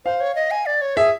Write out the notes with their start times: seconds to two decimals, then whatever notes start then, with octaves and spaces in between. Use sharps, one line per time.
0.05 C5 F5
0.20 C#5
0.35 D#5
0.51 G#5
0.66 D5
0.82 C#5
0.97 G#4 E5